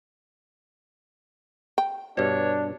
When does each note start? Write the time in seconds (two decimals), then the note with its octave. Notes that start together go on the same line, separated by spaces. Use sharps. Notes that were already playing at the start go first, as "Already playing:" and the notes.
1.78 G5
2.17 G2 B2 D4 C#5